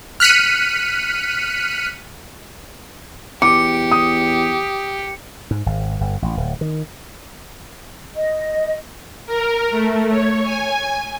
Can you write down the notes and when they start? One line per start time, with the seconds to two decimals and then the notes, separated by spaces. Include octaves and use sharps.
0.20 F6 F#6 B6 C#7 D#7
3.42 E2 G4 D6 C#7
3.91 D#6
5.51 G#2
5.66 G#1
6.01 G1
6.22 A1
6.37 D1
6.61 D#3
8.15 D#5
9.26 A#4
9.71 A3
10.09 C#5
10.43 G#5